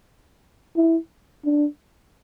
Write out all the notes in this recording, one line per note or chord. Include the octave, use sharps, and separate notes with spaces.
E4
D4